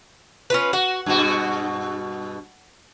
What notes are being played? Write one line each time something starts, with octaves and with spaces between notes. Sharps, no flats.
C#4 F4 B4
F#4 F#5
G2 B2 F#4